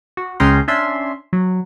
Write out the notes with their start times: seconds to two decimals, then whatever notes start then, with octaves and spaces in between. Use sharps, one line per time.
0.17 F#4
0.40 C#2 G#3 C#4 G5 A#5 C6
0.68 C#4 D4 E5 C6
1.33 F#3